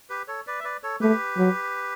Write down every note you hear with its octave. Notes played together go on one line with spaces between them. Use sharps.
G4 B4
A4 C#5
B4 D5
E5
B4 D5
A4 C#5
A3 G4 B4
F#3